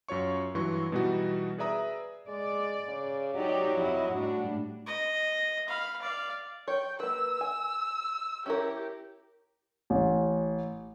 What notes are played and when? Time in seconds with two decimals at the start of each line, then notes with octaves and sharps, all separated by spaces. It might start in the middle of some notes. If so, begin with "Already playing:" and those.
0.08 F#2 F4 C#5 C#6
0.55 G2 E3 F#3 C6 C#6
0.92 B2 E3 G3 B3 D#4 F#4
1.58 G#4 B4 D5 E5 A#5 D#6
2.28 G#3 D5
2.88 C#3
3.35 F#3 D#4 G4 D5
3.77 F2 E4 D#5
4.12 A2 G3 D4 F#4
4.87 D#5
5.68 F5 B5
6.02 D5 F5
6.68 C#5 G5
7.00 A#3 B4 E6
7.41 G#5
8.46 C#4 E4 G4 A#4
9.90 A1